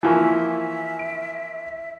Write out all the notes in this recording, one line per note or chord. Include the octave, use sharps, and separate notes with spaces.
E3 F3 A#3 E4 E5 G#5 C#6
D7